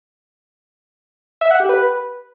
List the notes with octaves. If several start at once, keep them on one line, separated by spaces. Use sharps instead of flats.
E5
F#5
G4
B4